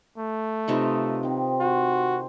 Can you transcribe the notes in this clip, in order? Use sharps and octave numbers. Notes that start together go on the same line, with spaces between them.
A3
C3 D#4 F4 B4 D#5 C#6
D#3 C4
F#4 C5